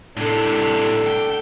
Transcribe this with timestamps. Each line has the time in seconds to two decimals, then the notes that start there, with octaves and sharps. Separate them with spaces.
0.17 A2 C3 D4 A4
1.06 G5